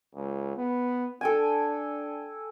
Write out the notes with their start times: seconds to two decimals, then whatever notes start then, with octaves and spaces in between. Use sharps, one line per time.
0.15 C#2
0.57 B3
1.21 D4 A4 G5 G#5